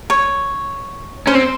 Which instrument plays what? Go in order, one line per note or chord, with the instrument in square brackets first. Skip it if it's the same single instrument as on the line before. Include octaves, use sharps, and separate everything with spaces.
[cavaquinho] C#5
[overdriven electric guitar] C#4 [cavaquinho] C5
[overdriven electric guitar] C4